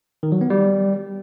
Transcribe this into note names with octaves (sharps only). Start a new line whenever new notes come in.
D#3
F#3
B3
G3